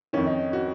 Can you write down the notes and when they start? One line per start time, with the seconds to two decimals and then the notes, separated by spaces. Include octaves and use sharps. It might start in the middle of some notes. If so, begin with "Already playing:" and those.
0.13 F2 D#3 C#4
0.26 D#4
0.53 F#4